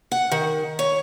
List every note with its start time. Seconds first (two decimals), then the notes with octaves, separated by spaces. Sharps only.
0.12 F#5
0.31 D#3
0.79 C#5